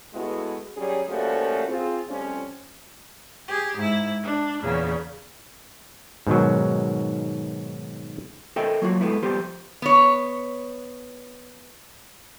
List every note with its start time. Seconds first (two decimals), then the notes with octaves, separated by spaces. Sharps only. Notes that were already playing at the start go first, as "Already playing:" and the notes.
0.14 G#3 A3 B3 E4 F#4 G#4
0.77 F#3 G3 C#4 G4 G#4 C#5
1.08 F3 G3 A3 A#3 C#4 F#4
1.68 C4 F4 G#4
2.09 C3 F3 G3 A3 C#4
3.48 G4 G#4
3.77 G#2 E4
4.22 D4
4.61 E2 A#2 C#3
6.27 G#2 B2 D#3 F#3
8.56 A4 A#4 C5 D#5 E5 G5
8.82 F#3 A#3 F4 F#4
9.01 G#3 A3 B3 E4
9.23 F3 G3 B3 G4 C5
9.82 B3 C#5